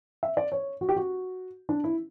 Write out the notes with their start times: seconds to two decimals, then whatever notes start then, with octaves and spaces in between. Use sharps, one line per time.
0.23 E5
0.37 D5
0.52 C#5
0.81 F#4
0.89 G4
0.96 F#4
1.69 D4
1.84 E4